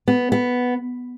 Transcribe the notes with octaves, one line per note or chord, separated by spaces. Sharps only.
B3
B3